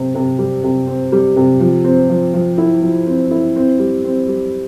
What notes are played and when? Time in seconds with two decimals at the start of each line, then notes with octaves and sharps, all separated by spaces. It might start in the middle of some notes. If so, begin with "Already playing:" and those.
Already playing: C3 C4
0.15 C3
0.39 G3
0.63 C3
0.87 C4
1.12 G3
1.36 C3
1.60 F3
1.84 C4
2.10 F3
2.34 F3
2.58 E4
2.82 F3
3.07 C4
3.31 E4
3.56 C4
3.79 G3
4.04 C4
4.28 G3